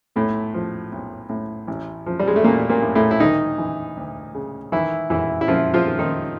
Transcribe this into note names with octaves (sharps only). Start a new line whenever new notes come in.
B1 A2 A3
F3
B1
A2
A1
F3
G3
G#3
A3
A1 A#2 A#3
A#2 A#3
A2
A2 A3
E4
D2 D#3 D#4
E3
D2
C#3
D#3 E3 E4
F#2 E3 E4
E4
F#2 F3 F4
F3 F4
D#3
D#3 D#4